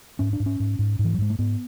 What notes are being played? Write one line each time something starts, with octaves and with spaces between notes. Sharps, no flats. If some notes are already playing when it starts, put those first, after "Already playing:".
G#2 C#4
D4
G#2
C#4
G#2
G#2
G#2
E3
F#3
G#2 G#3
A3
G#2 B3